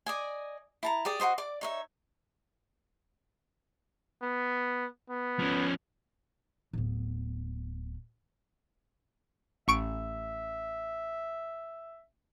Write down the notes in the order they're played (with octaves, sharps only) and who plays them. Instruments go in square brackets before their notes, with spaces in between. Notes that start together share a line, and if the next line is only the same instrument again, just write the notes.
[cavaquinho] D5 D#5 G#5
E4 A5 A#5
G4 G#4 D5 D#6
F#4 A#4 C5 D#5
D5 D6
D#4 C#5 E5
[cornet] B3
B3
[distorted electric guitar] F3 C#4
[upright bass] D1 B3
[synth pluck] A1 C#6 D7 [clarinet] E5